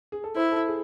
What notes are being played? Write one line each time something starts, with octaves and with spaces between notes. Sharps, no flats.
G#4
A4
E4 C5
A4
G#4